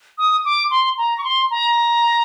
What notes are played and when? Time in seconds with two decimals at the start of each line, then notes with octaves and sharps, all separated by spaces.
0.18 D#6
0.45 D6
0.71 C6
0.98 A#5
1.18 C#6
1.24 C6
1.51 A#5